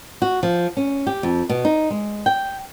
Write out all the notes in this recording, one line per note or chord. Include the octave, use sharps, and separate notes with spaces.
F#4
F3
C#4
G4
F2
B2
D#4
G#3
G5